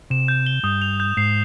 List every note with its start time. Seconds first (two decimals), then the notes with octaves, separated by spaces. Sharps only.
0.10 C3 E7
0.28 G6
0.46 G7
0.63 G2 D#6
0.82 F7
1.00 G6
1.17 G#2 C7